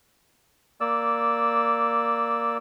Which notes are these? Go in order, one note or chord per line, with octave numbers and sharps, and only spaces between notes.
A#3 D5 E6